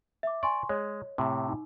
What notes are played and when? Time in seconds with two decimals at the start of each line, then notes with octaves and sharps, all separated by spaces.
0.23 E5 D6
0.43 D5 G#5 C6 C#6
0.69 G#3 C#5 D#5
1.18 A2 C3
1.48 D#4